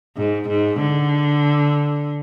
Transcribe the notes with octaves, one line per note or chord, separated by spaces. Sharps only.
G#2
G#2
D3